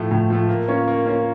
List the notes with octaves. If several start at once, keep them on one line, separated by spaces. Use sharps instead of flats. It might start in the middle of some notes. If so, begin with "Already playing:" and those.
Already playing: A2 F3 A3
A2
F3 A3
A#3
C#4 F4 A#4 C#5
A#3
C#4 F4 A#4 C#5